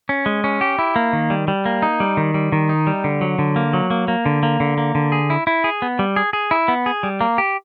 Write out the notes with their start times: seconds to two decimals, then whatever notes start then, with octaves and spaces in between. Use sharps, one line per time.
0.09 C#4
0.26 G#3
0.44 C#4
0.61 G4
0.79 E4
0.96 A#3
1.13 D#3
1.30 G3
1.48 G3
1.66 A#3
1.82 D#4
2.00 G3
2.17 D#3
2.34 G3
2.52 D#3
2.69 D#4
2.87 G3
3.04 D3
3.21 F#3
3.39 D3
3.56 A#3
3.73 F#3
3.90 A#3
4.08 A#3
4.26 D3
4.43 A#3
4.60 D3
4.78 A#3
4.95 D3
5.12 G#4
5.30 E4
5.47 E4
5.64 G#4
5.82 B3
5.99 G3
6.16 G#4
6.33 G#4
6.51 E4
6.68 B3
6.86 G#4
7.03 G3
7.21 A#3
7.38 G4